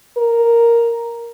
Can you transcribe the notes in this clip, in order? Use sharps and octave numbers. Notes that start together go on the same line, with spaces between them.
A#4